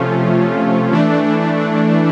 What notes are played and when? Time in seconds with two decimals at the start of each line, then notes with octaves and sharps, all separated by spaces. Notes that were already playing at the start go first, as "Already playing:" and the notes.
Already playing: C3 F3 A3 C#4 F4
0.92 E3 A3 D4